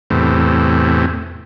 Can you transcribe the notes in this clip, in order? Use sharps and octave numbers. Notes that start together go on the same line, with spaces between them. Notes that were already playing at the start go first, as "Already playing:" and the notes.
E2 A2 C3